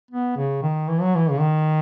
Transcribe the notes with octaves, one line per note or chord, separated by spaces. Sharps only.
B3
C#3
D#3
E3
F#3
E3
C#3
D#3